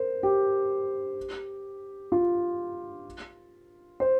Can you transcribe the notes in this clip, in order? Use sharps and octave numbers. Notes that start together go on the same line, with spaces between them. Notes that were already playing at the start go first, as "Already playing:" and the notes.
Already playing: A#4 C5
G4
F4
C5